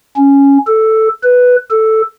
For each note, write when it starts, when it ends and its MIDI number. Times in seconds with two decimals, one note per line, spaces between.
0.17 0.58 61
0.67 1.08 69
1.23 1.56 71
1.70 2.02 69